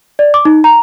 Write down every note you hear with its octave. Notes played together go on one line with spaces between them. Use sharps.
D5
D6
D#4
A#5